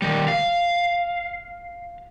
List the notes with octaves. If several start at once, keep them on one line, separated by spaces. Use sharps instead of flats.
D#3 G3
F5